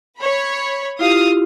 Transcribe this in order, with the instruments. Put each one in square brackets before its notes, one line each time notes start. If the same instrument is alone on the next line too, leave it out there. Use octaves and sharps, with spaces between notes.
[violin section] C#5 B5
[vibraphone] E4 F4 G4 [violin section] F5 D#6